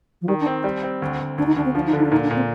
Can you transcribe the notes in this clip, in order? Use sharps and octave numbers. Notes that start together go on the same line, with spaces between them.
F3
D#3 G3
D4
C4
G3
C4
D2
D2
D2 D4
D#4
D2 D4
C4
F3 D4
D#4
D3
D#4
D4
A#2 D#4
D4
A#2
C4